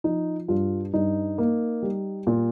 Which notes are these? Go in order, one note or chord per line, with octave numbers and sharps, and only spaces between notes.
F3 D#4
G2 F4
G2 D#4
A#3
G3
A#2